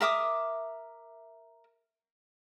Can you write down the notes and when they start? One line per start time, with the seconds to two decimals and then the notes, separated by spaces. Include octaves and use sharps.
0.01 A#4 E5 D6 D#6